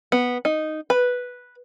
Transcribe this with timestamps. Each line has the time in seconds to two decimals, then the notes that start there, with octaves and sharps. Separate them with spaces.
0.12 B3
0.45 D#4
0.90 B4